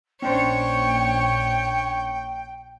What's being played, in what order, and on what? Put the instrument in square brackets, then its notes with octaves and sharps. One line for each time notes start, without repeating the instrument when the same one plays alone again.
[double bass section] A#1 [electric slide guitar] C#4 D4 C5 [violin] C#5 C#6 [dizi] G5